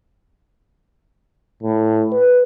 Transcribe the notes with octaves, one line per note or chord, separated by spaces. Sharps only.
A2
B4